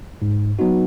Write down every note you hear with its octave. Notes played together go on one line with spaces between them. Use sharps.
G#2
F#3 B3 D#4 F#4